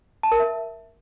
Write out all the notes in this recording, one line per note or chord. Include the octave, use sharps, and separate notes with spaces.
A5
A#4
E5